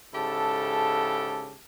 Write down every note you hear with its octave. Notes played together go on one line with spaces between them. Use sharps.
G#2 C#3 E4 G4 A4 A5